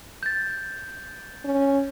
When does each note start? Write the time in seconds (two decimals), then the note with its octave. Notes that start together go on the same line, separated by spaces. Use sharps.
0.23 G6 A6
1.45 C#4